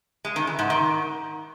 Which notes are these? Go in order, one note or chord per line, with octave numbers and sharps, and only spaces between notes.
G#3
D#3
E3
G#2
D#3